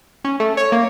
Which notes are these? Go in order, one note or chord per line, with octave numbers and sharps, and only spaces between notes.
C#4
A3
C#5
A#3